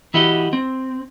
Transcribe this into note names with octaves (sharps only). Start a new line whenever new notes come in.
E3 E4 F#4 G4 D#5
C4